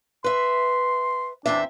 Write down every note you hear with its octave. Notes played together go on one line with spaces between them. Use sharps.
B4 E5 C6
E2 C4 D4 E5